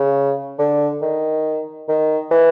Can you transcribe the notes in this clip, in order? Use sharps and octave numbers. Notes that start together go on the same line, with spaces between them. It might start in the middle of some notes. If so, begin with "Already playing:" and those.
Already playing: C#3
D3
D#3
D#3
E3